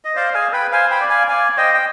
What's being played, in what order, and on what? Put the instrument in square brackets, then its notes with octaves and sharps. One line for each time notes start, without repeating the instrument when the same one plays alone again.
[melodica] D#5
[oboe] C5 [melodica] D5 F5
[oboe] G#4 [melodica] F5 G#5
[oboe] B4 [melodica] G5 B5
[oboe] C5 [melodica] F5 G#5
[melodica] G5 B5
[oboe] D5
[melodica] F5 G#5
[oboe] D5 [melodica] F5 G#5
[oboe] C5 [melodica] D#5 G5
[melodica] G5